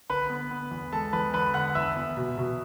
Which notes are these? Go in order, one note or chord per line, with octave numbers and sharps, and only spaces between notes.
D3 B4 B5
B3
B3
E2
G#3 A4 A5
E2 B4 B5
D3 B4 B5
D3 F#5 F#6
E2 E5 E6
E2
B2
B2